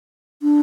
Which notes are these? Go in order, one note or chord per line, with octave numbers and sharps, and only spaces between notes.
D4